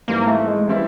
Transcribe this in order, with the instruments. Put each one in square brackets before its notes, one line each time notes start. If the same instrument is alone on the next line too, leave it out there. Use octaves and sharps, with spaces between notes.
[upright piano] G#2 E3 G3 C4 E4 [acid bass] A#3
[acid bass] A3
G#3
[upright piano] E3 G3 C4 E4